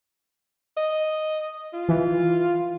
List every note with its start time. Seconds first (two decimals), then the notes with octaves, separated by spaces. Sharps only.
0.77 D#5
1.73 F4
1.89 E3